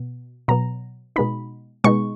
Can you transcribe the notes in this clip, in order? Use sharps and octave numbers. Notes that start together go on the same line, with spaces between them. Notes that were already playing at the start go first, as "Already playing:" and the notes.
Already playing: B2
B2 F#3 B3 A#5
B2 G#3 B3 D#4 B5
B2 G#3 B3 D#4 C#6